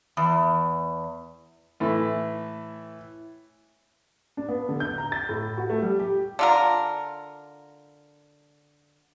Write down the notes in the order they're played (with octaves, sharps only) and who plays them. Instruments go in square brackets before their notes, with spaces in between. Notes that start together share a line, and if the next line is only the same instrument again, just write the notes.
[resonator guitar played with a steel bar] E2
[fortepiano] A2 E3 A3
[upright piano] D4
B3
D3
G6
A#5
A6
A2
F#4
A3
G3
G4
[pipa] D3 F4 A#4